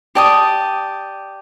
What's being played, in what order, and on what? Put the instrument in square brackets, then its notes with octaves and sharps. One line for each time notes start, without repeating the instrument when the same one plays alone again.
[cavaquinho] G4 D5 A5 D#6